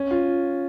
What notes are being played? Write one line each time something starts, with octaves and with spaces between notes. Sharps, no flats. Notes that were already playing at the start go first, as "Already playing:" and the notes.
Already playing: C#4
F4